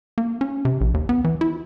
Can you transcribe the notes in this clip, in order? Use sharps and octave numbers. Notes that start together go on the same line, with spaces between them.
A#3
C#4
C3
A#1
D#2
B3
E3
E4